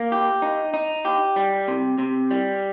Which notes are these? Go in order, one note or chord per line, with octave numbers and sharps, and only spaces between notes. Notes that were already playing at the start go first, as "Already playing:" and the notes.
Already playing: A#3
G4
D#4
D#4
G4
G3
C3
C3
G3